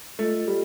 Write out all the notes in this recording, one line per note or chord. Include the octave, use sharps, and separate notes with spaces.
A3 F4 A4 D#5
G3